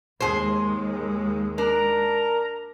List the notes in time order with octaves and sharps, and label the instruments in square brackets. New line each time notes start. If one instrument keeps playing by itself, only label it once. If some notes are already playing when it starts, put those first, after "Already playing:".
[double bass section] D#2 G#3 [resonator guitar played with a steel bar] G#4 C5
[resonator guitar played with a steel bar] D4 [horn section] A#4 A#5